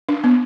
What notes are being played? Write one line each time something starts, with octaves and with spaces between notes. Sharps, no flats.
D4
B3